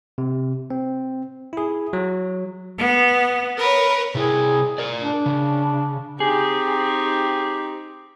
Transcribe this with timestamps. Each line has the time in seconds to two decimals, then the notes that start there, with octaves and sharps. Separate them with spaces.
0.18 C3
0.70 C4
1.53 E4 G#4
1.93 F#3
2.77 B3
3.58 A#4 B4 C#5
4.15 C3 E4 G#4
4.78 A#4 D5
5.01 D4
5.26 C#3
6.20 C4 D#4 G4 G#4